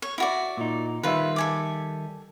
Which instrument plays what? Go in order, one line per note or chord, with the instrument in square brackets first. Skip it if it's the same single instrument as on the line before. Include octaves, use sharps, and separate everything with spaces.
[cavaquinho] C#5
E4 F#4 D5
[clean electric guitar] A#2 D#4
[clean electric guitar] D#3 G3 E5 [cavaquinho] F4 B4
[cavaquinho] A4 G#5 D6